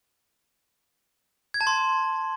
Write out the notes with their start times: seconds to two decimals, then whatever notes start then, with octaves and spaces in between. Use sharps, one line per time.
1.54 G#6
1.61 A5
1.67 C6